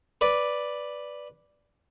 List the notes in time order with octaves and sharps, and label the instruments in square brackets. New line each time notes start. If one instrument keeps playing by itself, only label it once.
[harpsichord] B4 D5